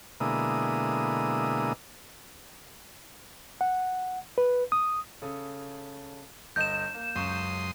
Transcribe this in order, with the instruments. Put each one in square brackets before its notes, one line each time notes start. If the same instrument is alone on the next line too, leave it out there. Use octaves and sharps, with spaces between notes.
[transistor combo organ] B2 D3 G#3 A#3 E4 D#6
[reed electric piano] F#5
B4
D#6
[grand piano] C#3 A4 D#6
[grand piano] G1 D#5 [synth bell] G6 E7
[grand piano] A#3
[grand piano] C#2 C#6 [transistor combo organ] F#2 C6 D#6